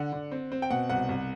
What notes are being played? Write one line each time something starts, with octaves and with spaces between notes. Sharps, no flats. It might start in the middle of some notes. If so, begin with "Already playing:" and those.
Already playing: D3 F#5
D3
C4
C4
G5
B2 F#5
C2 F#5
C2